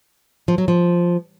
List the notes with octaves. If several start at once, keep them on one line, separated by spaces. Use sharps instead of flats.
F3
F#3
F3